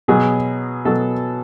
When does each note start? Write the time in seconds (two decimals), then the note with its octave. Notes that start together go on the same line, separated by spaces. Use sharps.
0.08 B2 F#3 B3 G#4
0.85 B2 F#3 B3 A4